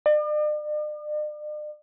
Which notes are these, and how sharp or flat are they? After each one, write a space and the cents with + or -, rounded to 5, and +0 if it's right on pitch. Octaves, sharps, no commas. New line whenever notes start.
D5 +45